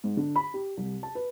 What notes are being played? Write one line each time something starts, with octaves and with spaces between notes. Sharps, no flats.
G#2
D3
B5
G4
C2
A5
B4